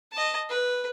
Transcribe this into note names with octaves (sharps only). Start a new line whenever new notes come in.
D#5 A5
B4